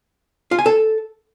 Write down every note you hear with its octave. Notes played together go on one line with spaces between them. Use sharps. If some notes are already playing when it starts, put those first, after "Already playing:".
F4
G#5
A4